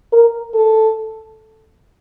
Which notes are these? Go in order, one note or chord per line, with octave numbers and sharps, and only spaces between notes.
A#4
A4